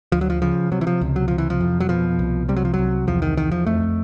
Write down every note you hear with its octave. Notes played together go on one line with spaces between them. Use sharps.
D2 F3
F#3
F3
C#3 F3
C3 F#3
E3
F3
C#2
F#3
C3 F3
E3
F3
F2
F#3
B2 F3
C2
C3 G3
F#3
F3
C2 F#3
E2 F3
D#3
E2 D#3
F3
F2 A3